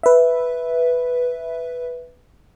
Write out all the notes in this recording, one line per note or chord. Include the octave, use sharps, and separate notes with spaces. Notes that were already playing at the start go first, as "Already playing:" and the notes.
B4 E5